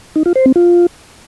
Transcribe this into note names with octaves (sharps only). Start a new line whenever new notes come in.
D#4
F4
C5
C4
F4